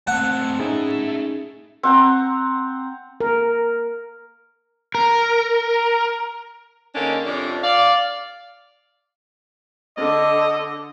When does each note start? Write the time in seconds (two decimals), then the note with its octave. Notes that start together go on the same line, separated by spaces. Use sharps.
0.07 A3 C4 F#5
0.59 A2 C#4 D#4 G#4 E5
1.83 C4 F#5 A#5
3.20 A#4
4.95 A#4
6.95 D3 D#3 G#3 A#3 C#4 D4
7.25 F2 C3 C#4 D4
7.63 D5 F5
9.97 D3 D#5